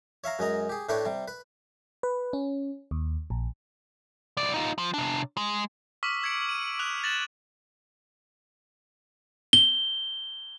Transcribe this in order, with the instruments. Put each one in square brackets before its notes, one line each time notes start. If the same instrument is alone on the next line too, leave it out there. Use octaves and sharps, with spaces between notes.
[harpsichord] C#5 E5 F5 A#5
F#2 G#3 D#5 A#5
G4 G#4
A2 A3 D4 B4 C#5 G5
C3 G3
B4
[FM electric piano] B4
C#4
D#2
A#1
[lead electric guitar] C2 D5
D#4 F4
F3
C3 D4
G#3
[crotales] C#6 D6 E6 F6 B6
E6 G#6 B6 C#7 D7 F#7
D#7
C#7
D#6 E6 F#6 F7
A6 A#6 E7 F#7
[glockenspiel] G7